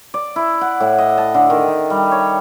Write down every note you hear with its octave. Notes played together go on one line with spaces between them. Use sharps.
D5
E4
F#5
A2
D#5
A5
D3
D#3
D#4
G3
C#5